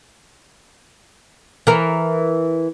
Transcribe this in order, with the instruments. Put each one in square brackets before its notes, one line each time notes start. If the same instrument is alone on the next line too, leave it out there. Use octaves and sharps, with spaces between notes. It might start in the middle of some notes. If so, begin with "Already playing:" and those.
[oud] E3 A#4